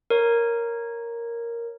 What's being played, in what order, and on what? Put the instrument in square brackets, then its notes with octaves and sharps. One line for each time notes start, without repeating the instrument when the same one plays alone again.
[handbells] A#4 C#5